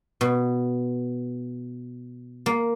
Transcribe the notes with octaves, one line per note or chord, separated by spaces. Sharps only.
B2
A#3